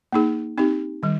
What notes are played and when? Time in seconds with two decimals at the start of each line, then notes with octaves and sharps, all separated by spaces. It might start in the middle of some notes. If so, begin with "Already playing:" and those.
0.13 A#3 D#4 G#4
0.58 C4 D#4 G4
1.03 D#3 G3